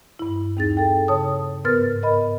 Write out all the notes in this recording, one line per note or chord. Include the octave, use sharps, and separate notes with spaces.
G2 E4
D#2 C4 D#4 G#4 A6
A4 G5
C#3 C#5 A5 D#6
G#2 B3 A#4 B4 F6 A6
A#4 D#5 B5